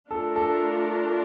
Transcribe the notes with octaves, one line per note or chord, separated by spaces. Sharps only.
A3 D4 F4 A4 A#4
A4